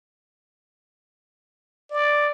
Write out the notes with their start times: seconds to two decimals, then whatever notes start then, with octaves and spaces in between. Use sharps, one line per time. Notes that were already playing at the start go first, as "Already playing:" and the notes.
1.91 D5